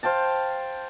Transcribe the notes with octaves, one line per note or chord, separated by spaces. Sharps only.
C5 F5 G5 A5